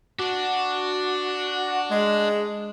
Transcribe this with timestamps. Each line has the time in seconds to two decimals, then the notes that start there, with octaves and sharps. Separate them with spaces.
0.19 D4 F#4
1.91 G#3